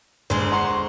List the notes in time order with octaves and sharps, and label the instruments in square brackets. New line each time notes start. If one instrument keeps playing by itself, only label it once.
[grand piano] G1 [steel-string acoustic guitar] G#3 C5
[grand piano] F#5 A#5 C6
C#6